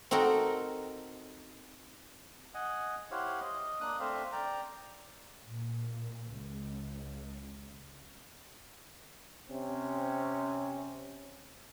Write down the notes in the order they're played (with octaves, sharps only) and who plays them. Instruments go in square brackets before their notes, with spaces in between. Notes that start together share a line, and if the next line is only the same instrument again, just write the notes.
[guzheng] C4 D#4 F#4 A4 A#4
[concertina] D#5 F#5 G#5
E4 G4 C5 C#5 F5 F#5
D#5
A#3 D4 D#6 F#6
A3 C4 D4 C5 E5 F5
D5 G5 A#5
[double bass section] A#2
C#2
[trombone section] C3 C4 C#4